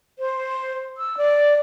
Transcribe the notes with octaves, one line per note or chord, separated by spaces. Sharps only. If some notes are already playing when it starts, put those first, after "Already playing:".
C5
E6
D5